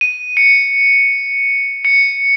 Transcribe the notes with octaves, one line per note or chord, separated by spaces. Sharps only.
D#7
C#7
C#7